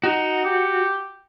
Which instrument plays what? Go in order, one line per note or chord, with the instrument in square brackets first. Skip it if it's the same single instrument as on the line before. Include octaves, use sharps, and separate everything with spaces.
[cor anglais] D#4 [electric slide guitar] F#4
[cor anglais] G4